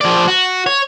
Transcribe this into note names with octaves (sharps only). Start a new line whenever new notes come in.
F3 D5
F#4
C#5